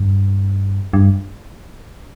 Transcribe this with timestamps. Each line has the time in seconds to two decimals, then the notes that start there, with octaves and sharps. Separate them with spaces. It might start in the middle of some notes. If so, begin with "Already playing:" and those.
Already playing: G2
0.93 G2